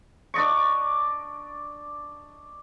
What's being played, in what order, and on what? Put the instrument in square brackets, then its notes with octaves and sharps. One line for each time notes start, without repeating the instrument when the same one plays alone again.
[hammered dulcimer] D4 D5 D#5 C#6